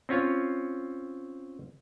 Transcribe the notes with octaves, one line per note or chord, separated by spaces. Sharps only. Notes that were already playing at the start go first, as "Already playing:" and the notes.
C4 C#4 F4 C#5